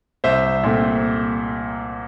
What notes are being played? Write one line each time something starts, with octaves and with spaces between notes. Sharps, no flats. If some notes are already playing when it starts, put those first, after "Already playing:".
C2 C5 E5
A#2 A3 C4